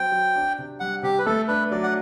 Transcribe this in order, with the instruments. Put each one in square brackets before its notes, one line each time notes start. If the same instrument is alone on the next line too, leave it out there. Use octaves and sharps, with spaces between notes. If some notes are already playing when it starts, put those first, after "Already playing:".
Already playing: [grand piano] F#3 C4 F#4 [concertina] G5
[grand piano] F#3
D4
C3
[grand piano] G3 [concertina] F#5
[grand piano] C3 [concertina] G4
[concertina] B4
[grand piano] A3 [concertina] A4
[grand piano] D4 [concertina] B4
[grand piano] F#3 [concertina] D5
[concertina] F#5